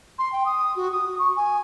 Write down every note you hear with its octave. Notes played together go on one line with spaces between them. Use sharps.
C6
G5
D#6
F#4
D#6
C#6
G#5